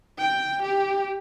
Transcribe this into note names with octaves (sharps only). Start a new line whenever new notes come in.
G5
G4